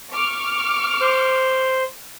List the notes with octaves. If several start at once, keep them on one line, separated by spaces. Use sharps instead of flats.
C#6 D6 F6
C5